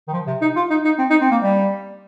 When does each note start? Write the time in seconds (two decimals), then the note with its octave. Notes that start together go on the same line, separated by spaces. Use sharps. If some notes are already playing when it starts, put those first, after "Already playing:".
0.08 D#3
0.13 F3
0.27 C3
0.41 D#4
0.56 F4
0.70 D#4
0.85 D#4
0.99 C4
1.10 D#4
1.21 C4
1.31 A#3
1.42 G3